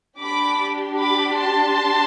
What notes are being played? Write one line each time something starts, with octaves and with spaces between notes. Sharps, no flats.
D4 G4 B5 D6
B5 D6
A5 C6